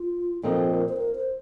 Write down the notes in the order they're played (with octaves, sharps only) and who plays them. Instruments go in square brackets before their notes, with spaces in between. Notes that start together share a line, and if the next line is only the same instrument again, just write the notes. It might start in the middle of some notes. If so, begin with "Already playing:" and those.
Already playing: [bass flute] F4
[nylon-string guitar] A#2 F3 C4 D#4 [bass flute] A4
[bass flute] A#4
C5
A#4
C5